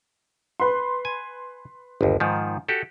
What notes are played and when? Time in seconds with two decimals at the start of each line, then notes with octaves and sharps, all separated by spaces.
0.60 B4 C6
1.05 G#5
2.01 G1 D#2
2.20 G#2 D#3 F3
2.69 F#4 G4 A4